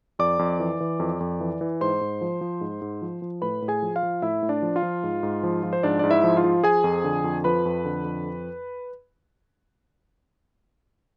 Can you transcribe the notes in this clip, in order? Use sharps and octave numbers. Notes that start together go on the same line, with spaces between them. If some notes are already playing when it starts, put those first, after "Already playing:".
F2 D5 D6
F2
E3
E3
F2
F2
E3
E3
G#2 C5 C6
G#2
F3
F3
G#2
G#2
F3
F3
A2 B4 B5
A2
G#4 G#5
F3
F4 F5
F3
A2 E4 E5
A2
D4 D5
F3
F4 F5
F3
G#2
G#2
F3
F3
C5
G#2 D4 D5
G#2 D5
E4 E5
F3
F4 F5
F3
F3 G#4 G#5
F2
D3
F2
F3 B4 B5
F2
D3
F2